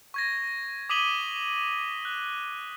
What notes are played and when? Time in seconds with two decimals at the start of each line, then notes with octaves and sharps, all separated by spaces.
0.14 C#6 G#6 A#6
0.89 D6 D#6 B6 D#7 F#7 G7
2.05 F#6